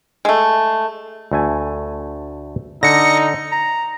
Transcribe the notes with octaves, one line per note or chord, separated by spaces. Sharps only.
G#3 A3
D2 A3 G#5
D3 D#4 A#6 C#7
A#5